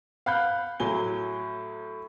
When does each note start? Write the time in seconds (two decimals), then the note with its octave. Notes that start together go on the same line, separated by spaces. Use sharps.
0.26 F5 F#5 B5 F#6 G6
0.80 A2 F#3 G#5 G7